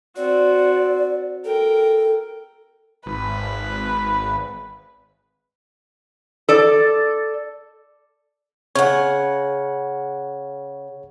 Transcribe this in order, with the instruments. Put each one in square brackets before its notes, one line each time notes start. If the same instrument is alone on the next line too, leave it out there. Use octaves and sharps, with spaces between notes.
[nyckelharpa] C4 F#4 [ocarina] D5
[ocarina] A4 [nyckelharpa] A#4 G5
[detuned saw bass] G#1 [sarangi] B4
[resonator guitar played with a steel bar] A4 D5
[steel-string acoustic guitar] C#3 F#5 [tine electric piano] C#5